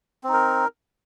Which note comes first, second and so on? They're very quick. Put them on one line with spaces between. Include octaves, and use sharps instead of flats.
C4 D#4 A#4